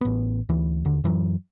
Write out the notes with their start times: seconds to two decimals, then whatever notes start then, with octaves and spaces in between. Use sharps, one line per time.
0.01 A1 B3
0.49 D2 E3
0.85 D#2 D3
1.04 F#2 E3 F#3